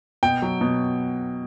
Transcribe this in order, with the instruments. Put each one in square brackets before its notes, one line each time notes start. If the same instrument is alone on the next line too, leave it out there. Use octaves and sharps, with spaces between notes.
[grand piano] B2 G5
F#3
B2